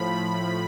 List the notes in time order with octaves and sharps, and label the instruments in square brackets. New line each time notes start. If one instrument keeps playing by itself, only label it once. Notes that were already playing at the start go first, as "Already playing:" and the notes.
Already playing: [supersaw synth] A2 F3 B5